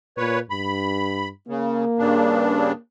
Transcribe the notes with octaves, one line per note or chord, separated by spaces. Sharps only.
A#2 B4 C#5
G2 B5
C#3 A#3
G2 C#3 D4